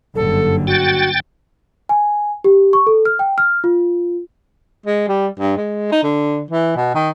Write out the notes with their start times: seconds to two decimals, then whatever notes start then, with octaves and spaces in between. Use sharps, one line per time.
0.16 F#1 G2 D3 A4
0.67 F#4 G5 A6
1.89 G#5
2.44 G4
2.73 C#6
2.87 A4
3.05 F6
3.19 G5
3.38 F6
3.64 F4
4.86 G#3
5.08 G3
5.39 G2
5.57 G#3
5.92 D#4
6.03 D3
6.51 E3
6.76 B2
6.95 D#3